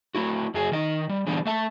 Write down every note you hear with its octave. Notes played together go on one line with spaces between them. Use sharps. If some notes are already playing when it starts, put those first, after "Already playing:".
A3 E4 F#4
F#2 F#3 G#4
D#3 D#5
G3
D3 E3 G3 A3 B3 D4
A3 E5 A5